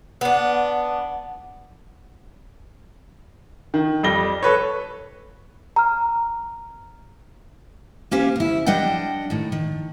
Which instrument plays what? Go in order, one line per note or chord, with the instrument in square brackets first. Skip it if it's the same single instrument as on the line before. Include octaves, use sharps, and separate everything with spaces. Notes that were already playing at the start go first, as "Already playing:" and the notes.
[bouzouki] B3 D4
[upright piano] D#3
F2 G3 A#6 G7
A4 B4 C#5
[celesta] A#5 F6
[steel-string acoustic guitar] A#3 C#4 G4 C5 F5 G#5
D2 E4
G3 D4 D#5 F#5 G5
A2 D#3
D#3